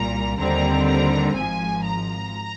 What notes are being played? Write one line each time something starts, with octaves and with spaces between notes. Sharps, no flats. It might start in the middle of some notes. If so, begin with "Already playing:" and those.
Already playing: C2 A#2 G3 A#5
D#2 D3 G3 C4 A#5
A#5
G#1 G#2 F3 G#5
A#5